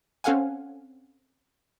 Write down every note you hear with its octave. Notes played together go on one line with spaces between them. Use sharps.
C4 C#4 A4 F5 F#5 G#5